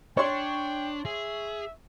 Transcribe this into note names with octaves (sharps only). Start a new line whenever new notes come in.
D4 C#5 G5 C6 C#6
G#4 E5